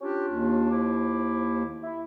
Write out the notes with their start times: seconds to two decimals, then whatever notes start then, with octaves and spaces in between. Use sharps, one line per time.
0.01 C#4 D4 F4 G4
0.28 D#2
0.70 F3 E4 D6
1.82 E4